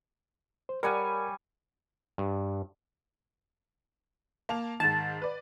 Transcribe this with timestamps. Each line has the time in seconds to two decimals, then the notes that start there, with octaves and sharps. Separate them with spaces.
0.69 C5
0.83 G3 A#4 C#5 F#5 G#5
2.18 G2
4.49 A#3 A5 F7
4.80 G#2 D#3 A5
5.22 B4 D5